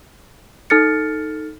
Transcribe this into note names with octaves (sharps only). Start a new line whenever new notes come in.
D#4 A4 F6 A6 C#7